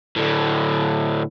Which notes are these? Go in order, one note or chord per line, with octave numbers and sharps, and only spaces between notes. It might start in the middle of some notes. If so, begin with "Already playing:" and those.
A2 D3